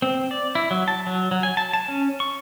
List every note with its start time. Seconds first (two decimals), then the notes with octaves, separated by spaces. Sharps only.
0.02 C4
0.31 D5
0.55 E4
0.71 F#3
0.88 A5
1.07 F#3
1.31 F#3
1.43 G#5
1.57 A5
1.73 A5
1.88 C#4
2.20 C#6